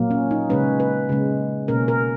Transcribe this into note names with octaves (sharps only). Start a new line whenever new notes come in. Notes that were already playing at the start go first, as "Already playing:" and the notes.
Already playing: A#2 F#3 A#3
C#4
D#4
C#3 G#3 C#4 B4
B4
C#3 G#3 C#4
B2 A#3 C#4 A#4
A#4